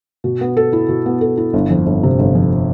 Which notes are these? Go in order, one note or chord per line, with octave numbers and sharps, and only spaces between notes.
B2
B3
A4
E4
B2
B3
A4
E4
G1
F2
G1
C3
G1
F2